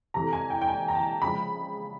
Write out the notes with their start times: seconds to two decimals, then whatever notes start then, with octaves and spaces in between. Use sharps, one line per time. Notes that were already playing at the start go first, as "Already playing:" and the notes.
0.14 C3 E3 A3 A#5
0.33 G#5
0.50 G5
0.61 G5
0.68 G#5
0.88 A#5
0.95 A5
1.22 C#3 F3 G#3 B5